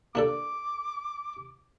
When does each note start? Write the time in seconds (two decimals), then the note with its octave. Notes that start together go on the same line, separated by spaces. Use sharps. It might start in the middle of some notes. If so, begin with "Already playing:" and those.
0.15 A#3 D4 A4 D6